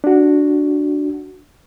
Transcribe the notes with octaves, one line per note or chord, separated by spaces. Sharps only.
D4 F#4